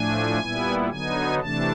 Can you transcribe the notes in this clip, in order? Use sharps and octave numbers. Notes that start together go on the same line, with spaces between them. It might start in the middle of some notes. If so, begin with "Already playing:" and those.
Already playing: A2 F3 A3 D4 G#5
A#2 G3 B3 E4
D3 F#3 B3 D#4 G#5
C3 E3 A3 D4 A5